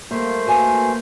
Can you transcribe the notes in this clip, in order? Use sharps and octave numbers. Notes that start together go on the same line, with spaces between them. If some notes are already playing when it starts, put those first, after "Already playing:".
G3 A3 A#3 C5
F#4 B4 G#5